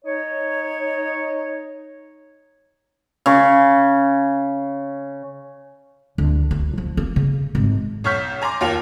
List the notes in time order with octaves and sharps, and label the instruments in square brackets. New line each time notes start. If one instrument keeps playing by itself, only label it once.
[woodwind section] D#4 C#5
[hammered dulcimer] C#3 C#6
[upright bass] D2
D2
F3
A#3
C#3
G#1
[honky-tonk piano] B1 C#5 C#6 F6 G6 B6
G#5 A#5 C6 D6
D#2 F4 A#4 F7